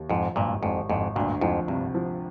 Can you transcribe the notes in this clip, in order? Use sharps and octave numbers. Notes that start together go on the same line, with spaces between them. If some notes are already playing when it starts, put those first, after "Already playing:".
Already playing: D#2
F2 G#2 F3
G#1 G2 A#2
G#1 F2 G#2
G#1 F2 G#2
D2 G2 A#2
F2 G#2 F3
G2 C3
F3